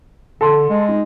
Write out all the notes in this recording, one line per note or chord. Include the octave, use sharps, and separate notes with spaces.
D3 A4 C6
G#3
D#4